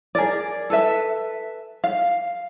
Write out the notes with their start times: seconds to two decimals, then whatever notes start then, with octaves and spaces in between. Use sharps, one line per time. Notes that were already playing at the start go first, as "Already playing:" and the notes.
0.15 G#4 A#4 D5
0.70 A4 B4 E5
1.84 F5